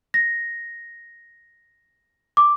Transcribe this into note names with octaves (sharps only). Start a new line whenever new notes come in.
A#6
D6